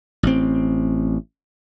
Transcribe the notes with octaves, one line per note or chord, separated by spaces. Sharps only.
A1 C4